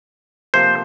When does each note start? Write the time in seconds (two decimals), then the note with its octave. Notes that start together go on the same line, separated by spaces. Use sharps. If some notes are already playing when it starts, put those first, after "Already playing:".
0.54 C3 F3 A#3 C5